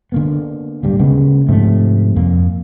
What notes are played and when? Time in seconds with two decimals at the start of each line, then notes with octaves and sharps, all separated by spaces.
0.12 D3 A#3 B3
0.83 D1 G2 G3
0.99 C#3 G#3 A#3 B3
1.49 G#2 C3 F3 A3
2.16 F2 A#3